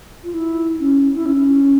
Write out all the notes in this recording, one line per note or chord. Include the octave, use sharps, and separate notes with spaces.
F4
E4
C#4
E4
C#4